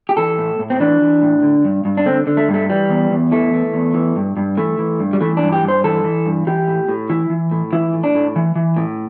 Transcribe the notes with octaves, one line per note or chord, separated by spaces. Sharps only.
G4
E3 A4
A2
A2
C4
E3 D4
E3
A2
D3
G2
G2
D4
D3 C4
D3
A3
G2
A3
E3 G3
E2
E2
E3 A3
E3
E2
E3
G2
G2
E3 A3
E3
G2
G3
E3 A3
D4
G2
G4
G2
C5
E3 A4
E3
G2
E3 G4
A2
A2
E3 E4
E3
A2
E3 E4
A2
D4
A2
E3
E3
A2